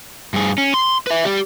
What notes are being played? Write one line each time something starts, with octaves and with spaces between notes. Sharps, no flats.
G2 G#4
C#4
C6
B4 E5
G4 D5